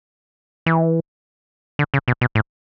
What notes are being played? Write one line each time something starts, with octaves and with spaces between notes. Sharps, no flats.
E3
D3
C#3
B2
B2
A2